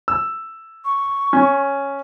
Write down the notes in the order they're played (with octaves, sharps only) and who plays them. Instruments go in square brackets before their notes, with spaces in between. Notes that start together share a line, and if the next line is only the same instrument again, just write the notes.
[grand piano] E6
[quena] C#6
[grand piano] C#4